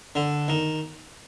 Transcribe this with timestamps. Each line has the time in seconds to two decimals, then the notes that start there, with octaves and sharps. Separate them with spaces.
0.15 D3
0.48 D#3